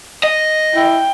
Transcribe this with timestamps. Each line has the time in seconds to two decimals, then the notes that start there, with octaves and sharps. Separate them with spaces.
0.23 D#5
0.75 E4 G5